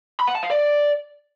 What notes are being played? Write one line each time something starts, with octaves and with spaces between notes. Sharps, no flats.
B5
F#5
A5
F5
D5